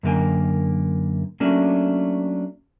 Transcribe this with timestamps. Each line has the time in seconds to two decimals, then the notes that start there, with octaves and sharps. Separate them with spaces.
0.03 F#2 D3 A#3 G5 G#5
1.40 F#3 A3 A#3 C#4 D4